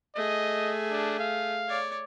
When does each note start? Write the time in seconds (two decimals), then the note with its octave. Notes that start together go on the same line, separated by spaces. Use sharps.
0.16 A3 G#4 D#5
0.91 D4
1.19 F5
1.68 C#5 D5